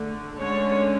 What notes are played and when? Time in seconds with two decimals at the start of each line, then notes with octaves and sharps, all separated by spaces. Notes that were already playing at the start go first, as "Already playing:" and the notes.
Already playing: D3 A3
0.38 D3 G#3 C#4 C#5